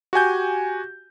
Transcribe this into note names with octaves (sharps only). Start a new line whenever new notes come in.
F#4 G4 G#5 G6